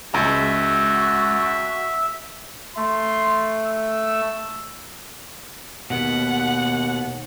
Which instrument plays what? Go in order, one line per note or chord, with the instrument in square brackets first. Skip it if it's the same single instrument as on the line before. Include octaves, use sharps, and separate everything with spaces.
[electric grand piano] C#2 [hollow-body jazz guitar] G#3 A#5 [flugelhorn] F#4 [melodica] E5
[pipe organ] A3 [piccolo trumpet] C6
[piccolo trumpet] E6
[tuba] D#2 [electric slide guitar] B2 B3 [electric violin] F#5